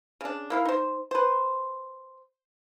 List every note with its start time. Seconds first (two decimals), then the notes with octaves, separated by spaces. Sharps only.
0.21 C#3 D4
0.50 A#3 E4 F5
0.65 D#4 C5
1.11 B4 C5